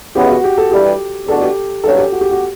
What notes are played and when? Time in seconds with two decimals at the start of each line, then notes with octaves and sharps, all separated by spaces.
0.15 C#2 C#3 E3 B3 G4
0.30 F#4
0.44 G4
0.58 A4
0.71 G2 E3 G3 G4
1.28 E2 B2 A3 D4 F#4 A4
1.42 G4
1.84 A1 G2 F#3 C#4 A4
1.98 G4
2.12 F#4
2.21 G4
2.31 F#4